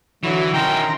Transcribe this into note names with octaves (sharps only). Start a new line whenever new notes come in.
D3 E3 F#3 E4 F#4
D#3 C#4 D#4 E4 G5 A#5 C6